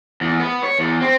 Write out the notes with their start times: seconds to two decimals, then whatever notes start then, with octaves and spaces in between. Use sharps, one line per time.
0.21 E2
0.40 B3
0.63 C#5
0.79 E2
1.01 C4